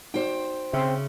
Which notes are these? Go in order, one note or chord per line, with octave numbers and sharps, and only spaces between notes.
D#4 F#4 C5 D5 G5
C#3 C4 E5 C6